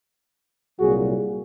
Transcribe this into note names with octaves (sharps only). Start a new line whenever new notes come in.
C2 A#2 F#3 F#4 G#4